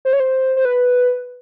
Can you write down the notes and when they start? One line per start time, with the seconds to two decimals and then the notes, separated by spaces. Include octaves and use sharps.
0.05 C5
0.13 C#5
0.20 C5
0.56 C5
0.65 B4